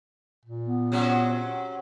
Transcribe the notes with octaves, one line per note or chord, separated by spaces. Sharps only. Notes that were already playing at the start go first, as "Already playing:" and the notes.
A#2
B3
C3 F#3 C#4